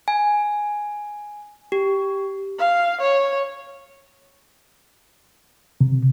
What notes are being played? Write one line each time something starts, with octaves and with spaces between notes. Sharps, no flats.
G#5
G4
F5
C#5
C3